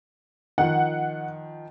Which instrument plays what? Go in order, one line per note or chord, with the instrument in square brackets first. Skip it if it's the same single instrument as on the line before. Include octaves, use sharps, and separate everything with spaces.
[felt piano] D#3 F3 [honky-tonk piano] F#5